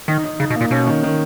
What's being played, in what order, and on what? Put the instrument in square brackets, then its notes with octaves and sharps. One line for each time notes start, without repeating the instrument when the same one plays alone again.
[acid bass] D#3 [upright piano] D#4
[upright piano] D#4
[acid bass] C#3 [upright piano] D#4
[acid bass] B2
[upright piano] A#3
[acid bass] A#2
[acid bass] B2 [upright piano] C#4
[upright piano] D#3
D#3